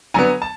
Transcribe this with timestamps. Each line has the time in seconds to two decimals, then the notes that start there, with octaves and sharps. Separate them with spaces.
0.14 D3 F#3 B3 G#5 A#5
0.42 A5